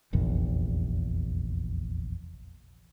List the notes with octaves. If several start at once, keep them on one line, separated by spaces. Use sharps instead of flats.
F1 A#1 E2